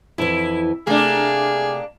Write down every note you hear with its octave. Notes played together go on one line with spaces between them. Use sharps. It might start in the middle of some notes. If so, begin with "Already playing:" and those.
F2 E3 E4
C3 A3 A#3 D4 G#4